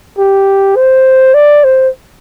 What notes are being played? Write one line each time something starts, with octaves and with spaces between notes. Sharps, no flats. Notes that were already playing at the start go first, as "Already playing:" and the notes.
G4
C5
D5
C5